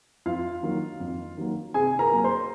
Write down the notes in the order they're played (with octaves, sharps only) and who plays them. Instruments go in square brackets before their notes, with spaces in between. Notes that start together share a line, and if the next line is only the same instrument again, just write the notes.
[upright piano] F2 F4 F5
D#3 F#3 A#3
F2
D#3 F#3 A#3
C3 G#4 G#5
A#4 A#5
F#3 A#3
C5 C6